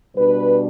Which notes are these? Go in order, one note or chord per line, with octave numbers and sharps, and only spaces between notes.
B2 G3 D4 B4